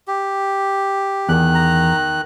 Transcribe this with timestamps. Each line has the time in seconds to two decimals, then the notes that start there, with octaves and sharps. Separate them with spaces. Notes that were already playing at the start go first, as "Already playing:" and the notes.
0.07 G4
1.29 E2 D#3 F#6
1.55 A#5